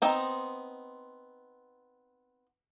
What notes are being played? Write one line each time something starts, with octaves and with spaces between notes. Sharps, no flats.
B3 C4 D#4